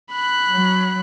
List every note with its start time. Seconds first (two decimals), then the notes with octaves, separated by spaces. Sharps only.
0.12 B5 F#6
0.51 F#3